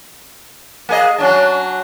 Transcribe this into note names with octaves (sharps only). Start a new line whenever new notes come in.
A#3 G#4 D#5
F#3 C#4 D4